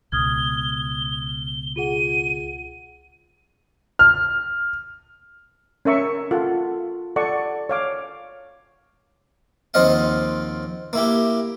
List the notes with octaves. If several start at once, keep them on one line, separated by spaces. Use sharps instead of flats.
C#2 B2 D#6 F6 G#6 G7
F4 G#4 F#5 D#7
F6
C#4 A#4 E5 C#6
F4 A4 F#5
A4 D5 F#5 C#6
C#5 F5 D6
D#2 F3 C4 D#5 F5 F#5
A#3 E4 G4